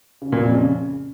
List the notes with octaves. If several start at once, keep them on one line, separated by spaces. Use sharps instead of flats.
C#3
A#2
F2
C#3